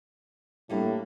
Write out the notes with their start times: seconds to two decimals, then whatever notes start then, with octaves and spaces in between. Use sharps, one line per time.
0.70 A2 G3 A#3 D4